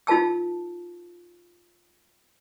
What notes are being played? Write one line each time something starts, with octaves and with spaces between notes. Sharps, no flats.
D#4 F4 A#4 A5 E6